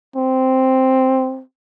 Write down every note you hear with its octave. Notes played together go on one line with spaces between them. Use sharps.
C4